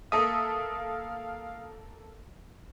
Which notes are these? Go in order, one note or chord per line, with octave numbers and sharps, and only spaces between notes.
A#3 A4 E5 F5 D#6